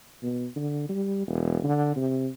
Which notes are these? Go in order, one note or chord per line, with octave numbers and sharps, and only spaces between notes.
B2
D3
G3
E1
D3
C3